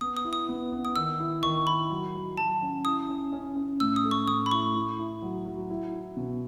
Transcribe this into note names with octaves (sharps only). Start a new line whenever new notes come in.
B3 D#6
D#6
E4
D#6
B3
B3
D#6
D#3 E6
E4
D#3 C#6
E4 B5
F#3
F#3
F#3 A5
C#4
E4 D#6
C#4
C#4
C#4
A2 E6
D#6
A3
C#6
A2 D#6
B5
E4 C#6
E4
E4
F#3
F#3
E4
E4
B2